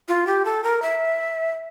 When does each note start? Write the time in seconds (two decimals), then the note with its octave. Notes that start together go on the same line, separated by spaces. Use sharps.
0.08 F4
0.27 G4
0.45 A4
0.64 A#4
0.82 E5